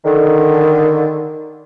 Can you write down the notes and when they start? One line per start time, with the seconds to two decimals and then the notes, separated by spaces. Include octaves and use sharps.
0.05 D3 D#3